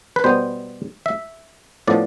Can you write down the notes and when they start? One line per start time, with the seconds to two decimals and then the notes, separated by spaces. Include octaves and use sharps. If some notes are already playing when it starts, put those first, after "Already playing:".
0.16 B4
0.24 B2 G3 B3 C5
1.06 E5
1.87 A2 F3 B3 D4 D5